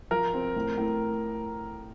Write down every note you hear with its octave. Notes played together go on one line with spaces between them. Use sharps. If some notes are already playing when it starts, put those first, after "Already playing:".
F3 A#4
C4
A2
A2